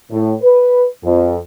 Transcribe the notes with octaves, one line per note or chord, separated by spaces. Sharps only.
A2
B4
F2